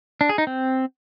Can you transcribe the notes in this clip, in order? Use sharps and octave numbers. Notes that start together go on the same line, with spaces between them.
D4
G#4
D#4
C4